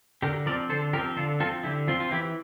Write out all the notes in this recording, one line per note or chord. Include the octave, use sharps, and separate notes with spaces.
D3 G4 A#4
F3 C4 A#4 D5
D3 A4 C5
F3 C4 G4 A#4
D3 F4 A4
F3 C4 F4 A4
D3 E4 G4
F3 C4 F4
F4
E3 E4 G4